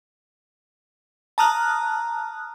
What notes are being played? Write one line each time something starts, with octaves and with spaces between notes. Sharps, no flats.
A5 A#5 D#6 F6 F#6